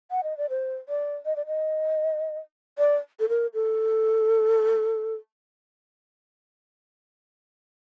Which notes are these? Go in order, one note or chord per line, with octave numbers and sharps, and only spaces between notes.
F#5
D#5
D5
C5
D5
D#5
D5
D#5
D5
A4
A#4
A4